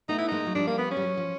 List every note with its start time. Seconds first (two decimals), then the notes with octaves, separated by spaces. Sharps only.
0.09 A3 B3 D#4
0.18 E4
0.28 G#3 A#3 D#4
0.47 F#3
0.55 F3 G3 D4
0.67 A#3
0.78 B3
0.91 C#4
0.97 G3
1.02 F#3
1.17 F3